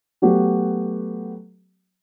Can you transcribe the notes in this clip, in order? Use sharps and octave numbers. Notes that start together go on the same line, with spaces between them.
F#3 A3 B3 F#4 G4